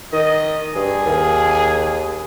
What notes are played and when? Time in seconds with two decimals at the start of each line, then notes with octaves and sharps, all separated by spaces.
0.13 D#3 D#5
0.76 G2 G#4
1.06 D#2